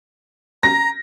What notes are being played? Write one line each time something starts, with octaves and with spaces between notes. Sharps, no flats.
A#5 A#6